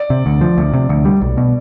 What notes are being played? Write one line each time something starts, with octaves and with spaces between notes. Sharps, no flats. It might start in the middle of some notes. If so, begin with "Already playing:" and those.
Already playing: D5
C3
D2
F3
D2
C3
D2
G3
B1
B2